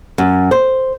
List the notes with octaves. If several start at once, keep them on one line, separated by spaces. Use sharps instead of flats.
F#2
C5